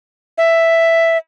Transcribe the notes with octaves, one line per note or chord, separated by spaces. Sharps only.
E5